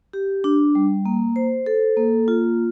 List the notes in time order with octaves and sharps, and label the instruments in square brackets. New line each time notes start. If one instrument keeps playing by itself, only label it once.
[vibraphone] G4
D4
G3
A#3
C5
A4
A#3
F4